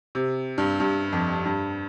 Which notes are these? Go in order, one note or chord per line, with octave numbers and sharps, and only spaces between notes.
C3
G2
G2
F2
G2